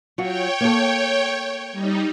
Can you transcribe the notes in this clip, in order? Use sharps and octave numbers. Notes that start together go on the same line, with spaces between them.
F#3 F4 F#4 C#5 G5
A#3 A4
G3 D#4